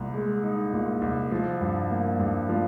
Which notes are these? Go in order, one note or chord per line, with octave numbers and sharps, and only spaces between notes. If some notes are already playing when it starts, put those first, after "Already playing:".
Already playing: C2 A#2
G#3
D#4
A#2
C2
F3
G2
A#3
G2
F3